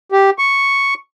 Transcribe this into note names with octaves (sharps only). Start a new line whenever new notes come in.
G4
C#6